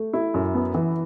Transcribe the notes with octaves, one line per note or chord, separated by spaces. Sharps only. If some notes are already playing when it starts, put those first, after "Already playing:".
Already playing: A3
E4
F#2
B3
E3